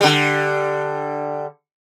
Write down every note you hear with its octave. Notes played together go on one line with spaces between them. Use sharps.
D3 G3